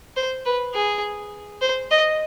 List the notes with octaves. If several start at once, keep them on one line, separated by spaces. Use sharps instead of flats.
C5
B4
G#4
C5
D#5